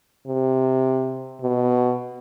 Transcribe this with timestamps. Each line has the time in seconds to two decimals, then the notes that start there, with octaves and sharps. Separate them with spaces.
0.27 C3
1.42 B2